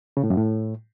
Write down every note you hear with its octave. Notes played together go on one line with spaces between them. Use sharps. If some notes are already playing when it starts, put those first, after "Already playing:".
C#3
A2
F#2
A2